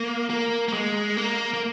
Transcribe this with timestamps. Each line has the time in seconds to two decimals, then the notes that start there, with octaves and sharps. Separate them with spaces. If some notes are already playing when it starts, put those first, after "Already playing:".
Already playing: A#3
0.30 A#3
0.68 A#3
0.73 G#3
1.17 A#3
1.54 A#3